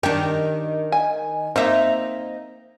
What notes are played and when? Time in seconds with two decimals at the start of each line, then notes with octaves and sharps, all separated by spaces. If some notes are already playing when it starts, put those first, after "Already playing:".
0.03 D#3 D4 G4
0.92 G#5
1.56 A#3 C4 D#4 E5